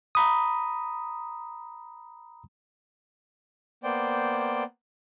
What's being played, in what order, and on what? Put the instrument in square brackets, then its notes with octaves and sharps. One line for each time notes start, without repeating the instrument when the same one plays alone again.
[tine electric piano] A#5 B5 D#6
[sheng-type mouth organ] A#3 B3 C5 D5 G5